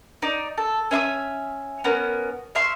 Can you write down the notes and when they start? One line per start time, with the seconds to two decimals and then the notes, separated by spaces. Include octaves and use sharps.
0.22 D#4 D5
0.58 A4
0.91 C#4 E5 C6 D#6
1.84 B3 C#4 A#4
2.55 E5 F5 C6 C#6